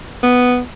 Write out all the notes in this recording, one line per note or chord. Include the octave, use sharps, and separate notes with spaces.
B3